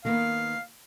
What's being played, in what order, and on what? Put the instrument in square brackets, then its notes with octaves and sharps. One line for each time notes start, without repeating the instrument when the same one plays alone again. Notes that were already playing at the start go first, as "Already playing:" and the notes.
[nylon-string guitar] D#3 A#3 B3 [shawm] F5